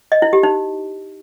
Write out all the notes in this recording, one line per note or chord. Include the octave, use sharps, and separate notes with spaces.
D#5
E4
G4
D#4